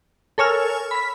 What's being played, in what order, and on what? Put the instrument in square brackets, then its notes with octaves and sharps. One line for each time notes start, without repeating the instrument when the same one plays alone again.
[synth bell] A4 A#4 C#5 G#5 E6 F6
B5 B6